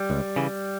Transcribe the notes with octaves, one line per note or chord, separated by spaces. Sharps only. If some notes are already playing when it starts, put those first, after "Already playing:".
Already playing: G3
C#2
C#3 E3